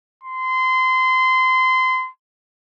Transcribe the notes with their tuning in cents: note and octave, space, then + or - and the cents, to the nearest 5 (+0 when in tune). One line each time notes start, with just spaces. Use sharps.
C6 -25